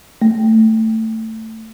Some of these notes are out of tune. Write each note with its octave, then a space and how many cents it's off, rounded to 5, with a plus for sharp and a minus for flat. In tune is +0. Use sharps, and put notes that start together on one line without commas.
A3 +15